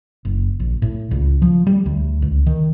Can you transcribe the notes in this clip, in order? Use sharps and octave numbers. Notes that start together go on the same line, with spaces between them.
F#1
A#1
A2
C#2
F3
G3
D2
C#2
D#3